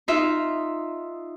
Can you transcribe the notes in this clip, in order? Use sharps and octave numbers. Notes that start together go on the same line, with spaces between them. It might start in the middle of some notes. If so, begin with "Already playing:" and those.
D#4 F4 E5